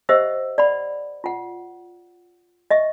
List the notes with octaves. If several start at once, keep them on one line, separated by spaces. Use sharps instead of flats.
G4 C5 D#5 E5 F#5 E6
D5 F#5 B5
F4 F#5
D#5 E5 C#6